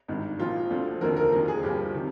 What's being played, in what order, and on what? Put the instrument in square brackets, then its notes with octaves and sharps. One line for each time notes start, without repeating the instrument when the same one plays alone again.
[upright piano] G#1 G2 D#3
A#1 A#2 F3 F4
D2 D3 F3
F1 D#2 D3 F3 A#4
A#4
D#2 D3 F3 A#4
G#4
G1 G2 F3 G4
C3 D#3